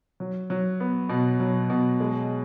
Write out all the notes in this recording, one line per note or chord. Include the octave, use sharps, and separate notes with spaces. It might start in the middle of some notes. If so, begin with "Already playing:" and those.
F#3
F#3
B3
B2
F#3
B2
G#3